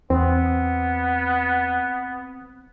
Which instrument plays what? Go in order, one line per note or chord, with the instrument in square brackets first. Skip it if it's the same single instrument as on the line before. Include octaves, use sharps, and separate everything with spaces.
[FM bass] E2 [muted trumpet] B3 [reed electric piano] C4